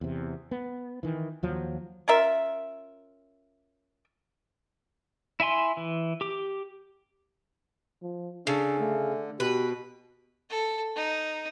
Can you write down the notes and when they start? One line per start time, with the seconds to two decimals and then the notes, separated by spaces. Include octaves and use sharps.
0.01 E2 C3
0.51 B3
1.03 D#3 E3
1.43 D#2 F3 F#3
2.08 C#4 F4 A#4 E5
5.40 E4 E5 G#5 C6
5.77 E3
6.21 G4 D6
8.02 F3
8.47 C#3 D4 A4
8.80 D3 A3
9.40 B2 G4 B4
10.50 A4
10.96 D#4